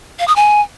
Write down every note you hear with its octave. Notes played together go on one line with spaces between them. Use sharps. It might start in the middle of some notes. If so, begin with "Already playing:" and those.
F5
D#6
G#5